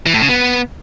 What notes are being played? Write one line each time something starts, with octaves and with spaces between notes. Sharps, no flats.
E3
A2
C#3
B3